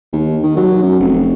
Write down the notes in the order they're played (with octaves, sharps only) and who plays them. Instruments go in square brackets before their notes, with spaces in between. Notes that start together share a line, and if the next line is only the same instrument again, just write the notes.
[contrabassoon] D#2
D#3
F#3
F#2
F1